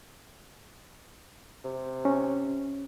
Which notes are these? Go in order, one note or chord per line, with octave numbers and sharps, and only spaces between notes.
C3
C#4